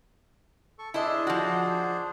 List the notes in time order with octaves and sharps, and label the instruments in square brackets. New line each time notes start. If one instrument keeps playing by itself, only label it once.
[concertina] A4 C#6
[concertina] D4 G#4 C5 [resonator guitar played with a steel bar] E4 D#5
[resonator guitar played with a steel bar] F3 F#4